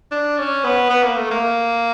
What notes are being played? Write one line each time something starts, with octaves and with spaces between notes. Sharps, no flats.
D4
C#4
B3
B3
A#3
A3
A#3